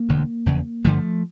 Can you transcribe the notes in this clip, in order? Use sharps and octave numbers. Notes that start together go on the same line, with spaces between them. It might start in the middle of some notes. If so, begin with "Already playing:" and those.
Already playing: A#3
E1 D2 D3
F1 E2 C#3
G1 G2 D3 F3 A3